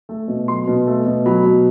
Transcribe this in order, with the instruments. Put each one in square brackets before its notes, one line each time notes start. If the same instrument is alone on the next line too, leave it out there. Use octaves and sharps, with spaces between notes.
[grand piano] A3
B2
F#3 C6
B2
A3
B2
F#3 B5
B2